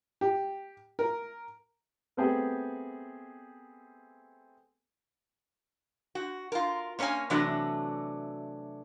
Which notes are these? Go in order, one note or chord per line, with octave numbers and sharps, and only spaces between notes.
G4
A#4
A3 B3 C4 G4 G#4
F#4
F4 A#4
A#3 C#4 C#5 D#5 G#5
C3 E3 F#3 A3 D4 F#4